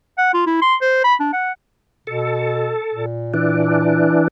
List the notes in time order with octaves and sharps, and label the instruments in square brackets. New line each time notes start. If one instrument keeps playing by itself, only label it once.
[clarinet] F#5
F4
E4
C6
C5
B5
D4
F#5
[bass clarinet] B2 [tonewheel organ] A4
[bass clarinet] A#2
[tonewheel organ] E3 D4